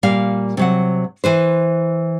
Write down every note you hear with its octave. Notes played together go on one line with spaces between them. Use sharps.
A#2 G3 A#3 F5
C3 F#3 F#5
E3 B4 C5